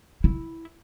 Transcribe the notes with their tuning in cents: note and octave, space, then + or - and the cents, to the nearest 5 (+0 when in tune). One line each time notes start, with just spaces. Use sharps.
E4 -5